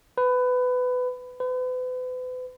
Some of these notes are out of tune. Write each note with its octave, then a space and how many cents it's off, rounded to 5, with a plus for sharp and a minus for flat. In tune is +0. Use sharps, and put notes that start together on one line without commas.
B4 +20
B4 +40